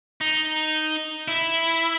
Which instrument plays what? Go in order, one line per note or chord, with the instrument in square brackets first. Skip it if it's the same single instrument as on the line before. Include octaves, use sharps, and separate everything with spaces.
[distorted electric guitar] D#4
E4